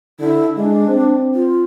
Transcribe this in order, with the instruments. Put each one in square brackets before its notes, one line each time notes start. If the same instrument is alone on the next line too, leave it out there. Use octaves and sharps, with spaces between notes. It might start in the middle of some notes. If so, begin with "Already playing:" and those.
[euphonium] D3 [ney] E4
[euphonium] G#3 [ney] D4
[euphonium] C4
[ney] F4